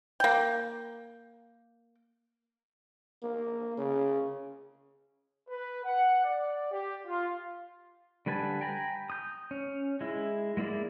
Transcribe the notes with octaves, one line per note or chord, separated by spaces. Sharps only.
A#3 G5
A#3
C#3
B4
F#5
D5
G4
F4
D3 G3 B4 G#5 A5
G5 G#5 A#5 B5
D#6 G6
C#4
G#3 E4
G#3 A#3 E4 D5